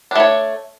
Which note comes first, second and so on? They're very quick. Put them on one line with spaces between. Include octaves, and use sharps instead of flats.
D4 A3 C#5